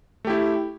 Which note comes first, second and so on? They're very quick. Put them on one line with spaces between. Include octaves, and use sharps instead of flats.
A3 G4 E4